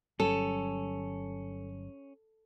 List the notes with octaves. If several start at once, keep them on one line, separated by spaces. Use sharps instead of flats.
G1 F#3 G3 C#4 A4